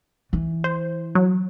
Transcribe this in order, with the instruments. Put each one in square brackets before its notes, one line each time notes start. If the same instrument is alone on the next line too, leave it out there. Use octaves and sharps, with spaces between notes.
[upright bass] E3
[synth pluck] C5
F#3